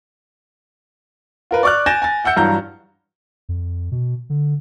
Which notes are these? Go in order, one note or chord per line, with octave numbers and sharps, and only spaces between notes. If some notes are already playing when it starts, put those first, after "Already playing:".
F4 A#4 B4
D5 C#6 D6 F6 F#6
G#5 G6 A6 A#6 D7 E7
G#5 A6
E5 F#5 E6 G6 C#7
G2 E3 F#3 F4 A#5 G6
F2
B2
D3